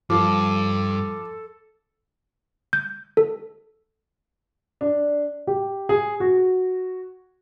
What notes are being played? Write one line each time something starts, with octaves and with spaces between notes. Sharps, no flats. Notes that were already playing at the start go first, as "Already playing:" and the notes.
G2 F3 A4 D6
G6
A4
D4
G4
G#4
F#4